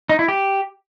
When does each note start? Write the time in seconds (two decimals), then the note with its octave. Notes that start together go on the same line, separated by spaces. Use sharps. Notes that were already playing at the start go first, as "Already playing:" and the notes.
0.09 D#4
0.19 E4
0.28 G4